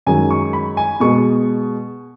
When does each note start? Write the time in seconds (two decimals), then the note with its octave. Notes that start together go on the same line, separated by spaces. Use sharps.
0.06 F#2 D#3 G#3 G#5
0.31 C#6
0.53 B5
0.77 G#5
1.00 B2 G#3 B3 C#6